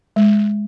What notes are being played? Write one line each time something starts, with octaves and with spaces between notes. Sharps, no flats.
G#3